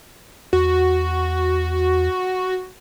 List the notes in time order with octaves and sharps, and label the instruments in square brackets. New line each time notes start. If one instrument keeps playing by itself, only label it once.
[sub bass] E2 [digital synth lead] F#4